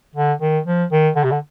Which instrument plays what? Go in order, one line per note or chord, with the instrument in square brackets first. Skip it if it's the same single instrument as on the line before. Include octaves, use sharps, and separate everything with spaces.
[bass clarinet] D3
D#3
F3
D#3
D3
C3
D3